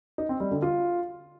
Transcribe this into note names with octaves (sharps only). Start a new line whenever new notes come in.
D#4
C4
G3
D3
F4